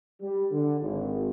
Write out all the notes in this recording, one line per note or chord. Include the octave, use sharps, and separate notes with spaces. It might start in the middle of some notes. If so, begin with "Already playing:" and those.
G3
D3
G#1